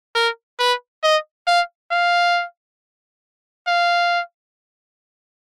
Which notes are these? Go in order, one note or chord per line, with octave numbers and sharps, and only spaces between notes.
A#4
B4
D#5
F5
F5
F5